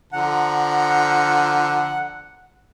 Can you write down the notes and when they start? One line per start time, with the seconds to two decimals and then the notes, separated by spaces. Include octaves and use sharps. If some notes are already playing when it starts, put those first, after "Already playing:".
0.13 D3 F3 F#5 A#5